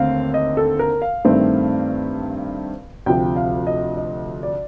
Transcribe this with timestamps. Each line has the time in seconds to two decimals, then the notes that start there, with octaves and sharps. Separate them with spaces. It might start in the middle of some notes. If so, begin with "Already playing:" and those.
Already playing: D#2 D3 A3 C4 F5
0.34 D#5
0.57 A4
0.79 A#4
1.02 F5
1.25 G2 D#3 A3 C4
3.06 D2 C3 F3 G5
3.36 F5
3.67 D#5
3.97 D#5
4.43 D5